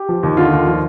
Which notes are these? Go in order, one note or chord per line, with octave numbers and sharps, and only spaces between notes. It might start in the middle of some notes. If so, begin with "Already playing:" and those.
Already playing: G4
F3
D#2
D3 F4
D#2
F3